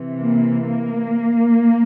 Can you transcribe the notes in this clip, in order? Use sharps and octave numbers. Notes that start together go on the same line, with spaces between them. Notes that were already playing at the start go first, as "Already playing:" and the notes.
Already playing: C3 E3
A#3
A#3